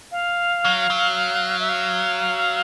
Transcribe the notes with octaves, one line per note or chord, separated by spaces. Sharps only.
F5
F#3
F#3
E5
F5